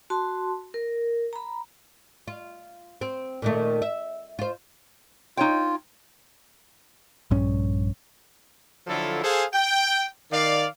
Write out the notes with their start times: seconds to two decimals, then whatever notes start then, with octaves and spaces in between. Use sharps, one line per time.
0.10 F#4 A5 C6
0.74 A#4
1.33 A#5 B5
2.28 F4
3.01 C4
3.42 A#2 D#3 A3
3.82 E5
4.39 F4 C5
5.37 D#4 F4 C#5 G5
7.31 A#1 G2 C#4
8.87 D3 F3 F#3 E4 F4 A4
9.23 G#4 A4 C5 F5 G#5
9.54 G5
10.31 D#3 D5 F5